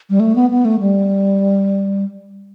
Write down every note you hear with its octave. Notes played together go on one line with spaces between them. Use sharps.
G3
A3
B3
B3
A3
G3